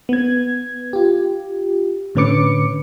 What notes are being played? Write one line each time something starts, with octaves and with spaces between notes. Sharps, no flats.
B3 G#6
F4 G4
A2 D3 C#4 B4 D6 C#7